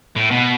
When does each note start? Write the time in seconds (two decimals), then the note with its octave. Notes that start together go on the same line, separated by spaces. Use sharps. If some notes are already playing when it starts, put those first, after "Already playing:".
0.16 A2
0.31 B2